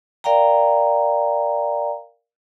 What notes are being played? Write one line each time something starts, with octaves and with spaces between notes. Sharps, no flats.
A#4 D5 F5 G5 A#5